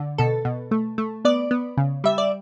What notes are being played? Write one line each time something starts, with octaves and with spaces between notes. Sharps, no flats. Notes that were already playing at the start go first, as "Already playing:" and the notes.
Already playing: D3
B2 A4
B2
A3
A3
B3 D5
B3
C#3
G3 E5
D5